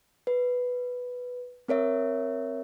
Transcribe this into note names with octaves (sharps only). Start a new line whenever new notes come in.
B4
C4 A#4 C#5 E5